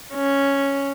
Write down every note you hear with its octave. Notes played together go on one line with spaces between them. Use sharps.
C#4